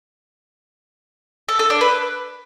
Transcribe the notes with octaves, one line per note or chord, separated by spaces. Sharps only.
A4
A4
D4
B4